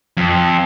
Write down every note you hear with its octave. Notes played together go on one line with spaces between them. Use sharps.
F2